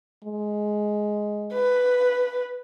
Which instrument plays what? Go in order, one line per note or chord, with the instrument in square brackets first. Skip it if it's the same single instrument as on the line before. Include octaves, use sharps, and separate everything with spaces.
[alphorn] G#3
[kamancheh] B4